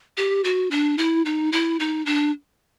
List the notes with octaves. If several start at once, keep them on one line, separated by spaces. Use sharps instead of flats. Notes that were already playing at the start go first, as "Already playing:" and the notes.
G4
F#4
D4
E4
D#4
E4
D#4
D4